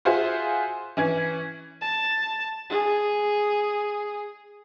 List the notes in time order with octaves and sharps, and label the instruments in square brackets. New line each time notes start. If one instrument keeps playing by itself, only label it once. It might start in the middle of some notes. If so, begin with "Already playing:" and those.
[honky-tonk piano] F4 F#4 G#4 C5 E5 G#5
E3 C#4 G#6
[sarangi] A5
G#4